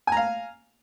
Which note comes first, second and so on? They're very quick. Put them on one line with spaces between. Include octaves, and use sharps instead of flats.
G#5 A#5 F5